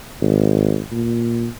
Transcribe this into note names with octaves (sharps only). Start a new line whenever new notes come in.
G#1
A#2